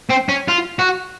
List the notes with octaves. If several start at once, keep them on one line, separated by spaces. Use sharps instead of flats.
C4
C#4
F4
F#4